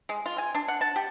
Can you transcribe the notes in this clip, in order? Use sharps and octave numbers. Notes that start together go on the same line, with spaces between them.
G#3
F4
G#5
D4
F#5
A5
G4